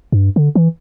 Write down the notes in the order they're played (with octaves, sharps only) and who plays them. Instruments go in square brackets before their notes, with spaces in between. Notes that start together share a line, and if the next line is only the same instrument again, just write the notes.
[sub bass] G2
D3
E3